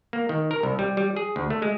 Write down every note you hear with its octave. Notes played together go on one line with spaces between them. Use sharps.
A#3
D#3
A#4
C2
G3
G3
G#4
D2
A3
G#3